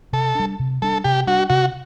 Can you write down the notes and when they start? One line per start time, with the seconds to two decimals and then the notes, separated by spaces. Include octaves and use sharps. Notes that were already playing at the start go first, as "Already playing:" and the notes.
0.13 C3 A4
0.35 G3 D4
0.59 C3
0.82 G3 D4 A4
1.04 C3 G4
1.27 G3 D4 F#4
1.50 C3 F#4